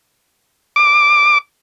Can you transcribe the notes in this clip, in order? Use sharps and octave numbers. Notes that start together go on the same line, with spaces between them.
D6